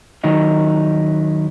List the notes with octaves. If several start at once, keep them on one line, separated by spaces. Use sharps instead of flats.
D#2 D#3 F#3 D#4 E4